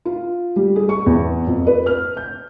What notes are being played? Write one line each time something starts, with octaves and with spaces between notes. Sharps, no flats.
F4
G3
G#4
C#6
E2
F2
B4
F6
G6